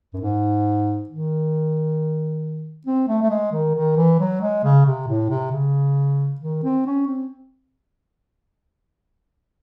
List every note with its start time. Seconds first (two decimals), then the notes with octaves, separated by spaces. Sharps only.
0.14 F#2
0.21 G#2
1.09 D#3
2.87 C4
3.08 A3
3.22 A3
3.30 G#3
3.52 D#3
3.76 D#3
3.97 E3
4.20 F#3
4.41 G#3
4.64 C#3
4.86 C3
5.08 A2
5.30 C3
5.52 C#3
6.40 D#3
6.64 C4
6.86 C#4
7.07 C4